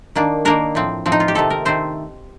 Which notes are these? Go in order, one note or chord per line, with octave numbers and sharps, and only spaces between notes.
D#3 A#3 D4
D#3 A#3 D4 A#4
A2 F3 C4
A2 F3 C4
D#4
F4
G4
C3 D#3 A3 C4 A4
A#4
C3 D#3 A3 C4 C5